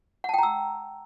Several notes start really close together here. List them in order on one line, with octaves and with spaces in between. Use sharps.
F#5 A5 G5 A#5 E6